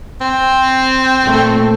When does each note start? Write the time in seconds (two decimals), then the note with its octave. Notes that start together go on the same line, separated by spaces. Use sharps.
0.21 C4
1.21 A#2 A3